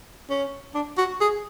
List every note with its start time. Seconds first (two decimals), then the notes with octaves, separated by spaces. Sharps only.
0.30 C#4
0.74 D4
0.98 F#4
1.21 G#4